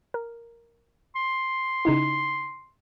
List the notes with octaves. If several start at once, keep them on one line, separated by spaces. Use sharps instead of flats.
A#4
C6
C#3 D#4 E4